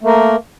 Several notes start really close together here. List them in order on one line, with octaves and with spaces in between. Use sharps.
A3 A#3 A#4